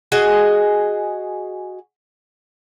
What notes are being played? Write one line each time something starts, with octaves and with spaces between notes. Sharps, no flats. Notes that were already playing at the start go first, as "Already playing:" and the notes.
F#4 G#4 D#5